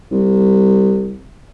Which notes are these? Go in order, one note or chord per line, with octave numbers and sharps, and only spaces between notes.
C2